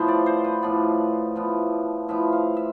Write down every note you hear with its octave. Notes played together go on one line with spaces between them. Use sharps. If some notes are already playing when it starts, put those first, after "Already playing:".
Already playing: A2 F3 B3 C5
D5
C5
B4
A2 F3 B3 D5
A2 F3 B3
A2 F3 B3 E5
F5
E5